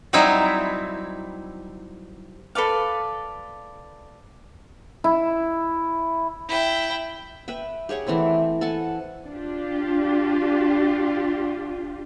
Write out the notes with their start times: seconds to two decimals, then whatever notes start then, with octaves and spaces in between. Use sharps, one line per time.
0.13 F#3 G3 C4 D#4 E4
2.55 A4 B4 D5 F5
5.04 E4
6.49 E4 G5
7.48 B4 E5 G5
7.89 G4 G#4 C#5 F#5
8.07 E3 A3 C4 E4
8.61 A4 F#5 G#5 A5
9.27 D4 F4 G4